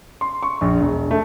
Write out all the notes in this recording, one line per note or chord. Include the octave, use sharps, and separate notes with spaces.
C6
C#6
A#1
E1
A3